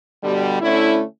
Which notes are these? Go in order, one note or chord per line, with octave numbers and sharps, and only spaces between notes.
B2 D3 G3
D3 A3 C#4 E4